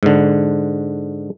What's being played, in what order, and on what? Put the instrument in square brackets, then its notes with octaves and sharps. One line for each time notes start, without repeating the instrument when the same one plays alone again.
[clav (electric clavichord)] G#2 D3